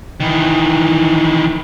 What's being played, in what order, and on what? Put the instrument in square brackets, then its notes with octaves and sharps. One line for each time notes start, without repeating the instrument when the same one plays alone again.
[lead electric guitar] D#3 E3